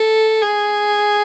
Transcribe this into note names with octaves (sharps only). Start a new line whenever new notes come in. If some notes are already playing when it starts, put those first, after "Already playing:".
Already playing: A4
G#4